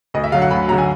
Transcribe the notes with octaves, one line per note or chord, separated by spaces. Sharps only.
D2 D#5
E5
D3 F#3 F5
F#5
D2 B5
D3 F#3 A#5
G#5